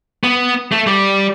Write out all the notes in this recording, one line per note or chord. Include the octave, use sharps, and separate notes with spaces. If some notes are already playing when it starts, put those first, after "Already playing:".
B3
A3
G3